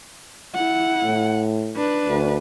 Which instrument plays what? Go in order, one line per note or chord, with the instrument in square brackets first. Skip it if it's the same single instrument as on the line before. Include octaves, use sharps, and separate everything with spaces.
[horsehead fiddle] E4 F#5
[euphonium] A2
[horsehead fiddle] D4 B4
[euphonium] D2